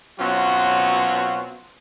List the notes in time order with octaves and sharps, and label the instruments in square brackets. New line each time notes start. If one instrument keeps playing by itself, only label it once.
[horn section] B2 F#3 C4 C#4 F4 F#4